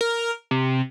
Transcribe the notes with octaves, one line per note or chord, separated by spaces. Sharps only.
A#4
C3